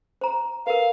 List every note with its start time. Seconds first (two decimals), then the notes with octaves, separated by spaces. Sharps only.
0.21 C5 A#5
0.67 A#4 B4 F5